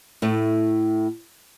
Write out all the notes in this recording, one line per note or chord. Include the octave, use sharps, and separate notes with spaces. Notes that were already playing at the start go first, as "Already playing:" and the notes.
A2 A3